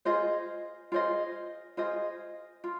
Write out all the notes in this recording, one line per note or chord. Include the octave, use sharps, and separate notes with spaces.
F4 G#4 C5 D#5
F4 G#4 C5 D#5
F4 G#4 C5 D#5
F4